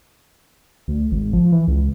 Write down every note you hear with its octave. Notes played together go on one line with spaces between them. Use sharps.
D2
G#1
F3
E3
C#2